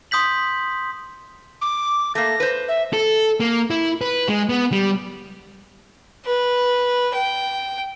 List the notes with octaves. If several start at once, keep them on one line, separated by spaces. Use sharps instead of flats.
C6 D#6 G6 B6 F#7
D6
A3 A#3 A#6
B4 C5
E5
A4
A#3
E4
B4
G#3
B3
G3
B4
G5